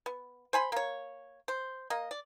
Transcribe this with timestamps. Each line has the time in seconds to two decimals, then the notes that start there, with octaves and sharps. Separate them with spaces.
0.06 B3
0.53 C5 G#5 B5 C6
0.72 A#3 C#5
1.48 C5
1.90 A#3 D#5
2.11 D5